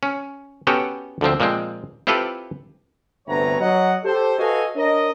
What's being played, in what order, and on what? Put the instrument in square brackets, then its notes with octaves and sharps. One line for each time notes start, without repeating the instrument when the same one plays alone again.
[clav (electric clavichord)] C#4
B3 C#4 F#4 G4 A4
D2 D3 F3 C4
A#2 F3 G#3 C4
C4 E4 F4 G4 A4 B4
[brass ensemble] G1 D2 C3 B4 C#5 A#5
F#3 D#5 F#5
G4 A4 C5
F#4 A4 B4 D#5 F5 G#5
D4 A#4 C#5 D#5